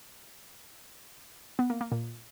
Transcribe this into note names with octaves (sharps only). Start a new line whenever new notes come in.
B3
A#3
A#3
A#2